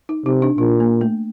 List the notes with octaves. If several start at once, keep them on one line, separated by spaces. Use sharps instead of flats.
D#4
C3 D#4
D4
A#2 D4
A#3
A3